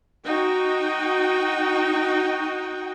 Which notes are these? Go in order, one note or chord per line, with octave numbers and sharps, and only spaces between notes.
D#4 F#4 G5